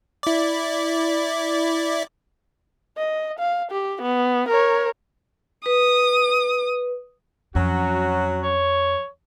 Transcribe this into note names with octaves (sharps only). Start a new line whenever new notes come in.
E4 D5
D#5
F5
G4
B3
A#4 C#5
B4 D#6
F2 F#3 C#4 F#4
C#5